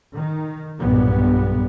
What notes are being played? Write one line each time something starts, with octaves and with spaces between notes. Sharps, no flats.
D#3
B1 G2 A#2 B3